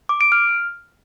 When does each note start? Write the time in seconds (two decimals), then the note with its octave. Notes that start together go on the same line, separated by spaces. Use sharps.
0.09 D6
0.21 D7
0.32 F6